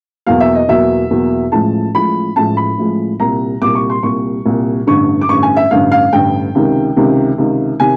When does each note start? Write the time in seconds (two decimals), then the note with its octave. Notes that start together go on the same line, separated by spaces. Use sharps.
0.27 E2 B2 F#3 A#3 F5
0.40 E5
0.55 D#5
0.68 E2 B2 F#3 A#3 E5
1.10 E2 B2 F#3 A#3
1.52 A1 A2 F3 G#3 A5
1.94 A1 A2 F3 G#3 B5
2.36 A1 A2 F3 G#3 A5
2.57 B5
2.78 A1 A2 F3 G#3
3.20 C2 A#2 G3 A#5
3.62 C2 A#2 G3 D6
3.75 C#6
3.90 C6
4.03 C2 A#2 G3 C#6
4.45 C2 A#2 G3
4.87 A1 G2 D3 C#6
5.21 D6
5.29 A1 G2 D3 C#6
5.43 G#5
5.57 E5
5.71 A1 G2 D3 F5
5.92 F5
6.13 A1 G2 D3 G5
6.55 C#2 C3 D#3
6.96 C#2 C3 D#3
7.38 C#2 C3 D#3
7.80 C3 D#3 G#5